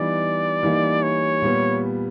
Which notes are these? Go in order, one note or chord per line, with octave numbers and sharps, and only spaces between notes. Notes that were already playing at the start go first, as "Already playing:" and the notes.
Already playing: E3 G3 B3 D#4 D5
E3 G3 A#3 D#4
C#5
A#2 G3 B3